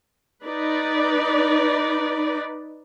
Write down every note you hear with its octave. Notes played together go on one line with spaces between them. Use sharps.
D#4 B4 D5